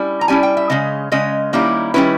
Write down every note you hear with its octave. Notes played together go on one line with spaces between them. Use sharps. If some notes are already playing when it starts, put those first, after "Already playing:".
Already playing: G3 C#4 E4
A#5
G3 C#4 E4 G#5
G5
E5
C#3 G#3 C#4 D#5
C#3 G#3 C#4 D#5
D#3 G3 A#3 C#4 E4
D#3 G3 A#3 C#4 E4 B4